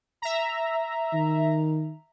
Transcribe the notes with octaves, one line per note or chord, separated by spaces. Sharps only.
E5 A#5
D#3